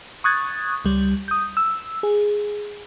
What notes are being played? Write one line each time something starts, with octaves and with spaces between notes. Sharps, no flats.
C#6 D#6 F#6 G#6 A6
C#2 G3
D#6 G6
E6
G#4